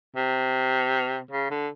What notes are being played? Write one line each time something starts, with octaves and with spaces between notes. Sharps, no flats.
C3
C#3
D3